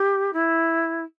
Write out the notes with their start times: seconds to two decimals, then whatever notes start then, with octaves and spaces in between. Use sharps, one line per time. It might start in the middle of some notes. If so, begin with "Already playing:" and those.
Already playing: G4
0.33 E4